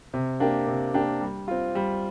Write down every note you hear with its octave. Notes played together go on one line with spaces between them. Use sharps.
C3
A#3 D4 G4
C3
A#3 D4 G4
G3
C4 F4
G3